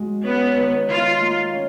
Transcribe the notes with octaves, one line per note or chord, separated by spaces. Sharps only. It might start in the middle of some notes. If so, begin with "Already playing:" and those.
Already playing: G#3 F#4
B3 C#4
D#3
D#3 F4
A#3
C#4